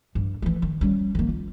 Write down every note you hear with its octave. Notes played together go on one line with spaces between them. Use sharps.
G2
E3 A3
D#3
G3 C#4
D#3 A#3
F4